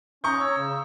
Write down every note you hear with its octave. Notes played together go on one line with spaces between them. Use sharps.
C#4 A#5 C#6 D#6 G6
C#5 E6
C#3